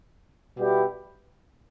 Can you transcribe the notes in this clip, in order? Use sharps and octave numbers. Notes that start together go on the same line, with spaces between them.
B2 G3 B3 E4 G4